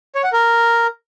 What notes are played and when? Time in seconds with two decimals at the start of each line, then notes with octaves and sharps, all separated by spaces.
0.15 C#5
0.24 F#5
0.33 A#4